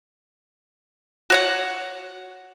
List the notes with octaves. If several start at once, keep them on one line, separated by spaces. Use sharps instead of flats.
F#4 C#5 F#5